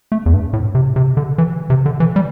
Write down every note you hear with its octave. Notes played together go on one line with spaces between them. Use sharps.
A3
E2
G2
A2
C3
C3
D3
E3
C3
D3
E3
G3